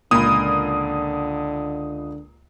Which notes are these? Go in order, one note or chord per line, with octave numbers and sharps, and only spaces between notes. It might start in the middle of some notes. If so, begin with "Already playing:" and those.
C#2 A#2 D3 B5 D#6